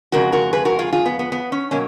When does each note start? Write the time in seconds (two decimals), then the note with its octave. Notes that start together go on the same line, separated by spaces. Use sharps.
0.12 F2 C#3 G#3 F#4 A#4
0.32 F#4 A#4
0.53 G#4 B4
0.65 F#4 A#4
0.79 F4 G#4
0.92 F4 G#4
1.06 B3
1.19 B3
1.32 B3
1.52 C#4
1.71 B2 F#3 A#3 C#4